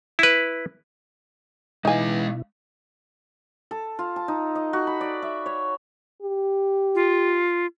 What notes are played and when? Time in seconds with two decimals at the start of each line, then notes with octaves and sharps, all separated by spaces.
0.19 E4 B4
1.85 B2 E3 G#3 D#4 E4 F5 G#5
3.71 A4
3.99 F4
4.16 A5
4.28 D#4
4.55 D#5
4.73 F#4
4.87 B5
5.01 D5
5.22 E5
5.46 C#5
6.23 G4
6.95 F4